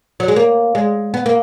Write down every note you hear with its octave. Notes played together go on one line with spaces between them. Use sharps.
F#3
G#3
A#3
G#3
B3
A#3